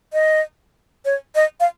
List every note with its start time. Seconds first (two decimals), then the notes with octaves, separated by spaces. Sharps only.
0.13 D#5
1.05 C#5
1.35 D#5
1.60 F5